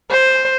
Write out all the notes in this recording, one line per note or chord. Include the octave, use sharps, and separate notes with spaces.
C5